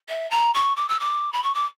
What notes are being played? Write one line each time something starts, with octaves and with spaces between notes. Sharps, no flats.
E5
A#5
C#6
D6
E6
D6
B5
C#6
D6